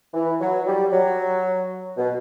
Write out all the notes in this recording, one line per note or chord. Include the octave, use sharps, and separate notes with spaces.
E3
F#3
G3
F#3
B2